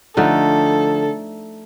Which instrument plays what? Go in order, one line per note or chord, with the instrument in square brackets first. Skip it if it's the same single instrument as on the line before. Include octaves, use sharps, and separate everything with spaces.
[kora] D3 F3 A3 D#4 [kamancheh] A4